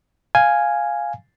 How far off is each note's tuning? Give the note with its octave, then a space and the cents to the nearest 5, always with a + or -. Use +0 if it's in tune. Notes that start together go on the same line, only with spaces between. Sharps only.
F5 +0 G#5 +0